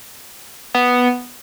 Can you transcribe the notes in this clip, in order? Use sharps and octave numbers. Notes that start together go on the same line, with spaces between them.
B3